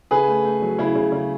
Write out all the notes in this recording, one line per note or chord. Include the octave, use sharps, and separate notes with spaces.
C#3 G#4 B4
A3
A3
F#3
C#3 E4
C#3
C#3